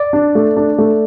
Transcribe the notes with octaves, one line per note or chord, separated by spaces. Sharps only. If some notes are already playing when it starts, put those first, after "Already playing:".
Already playing: D5
D4
A3
D4
A3